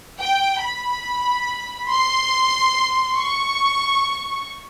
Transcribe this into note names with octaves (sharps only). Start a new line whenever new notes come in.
G5
B5
C6
C#6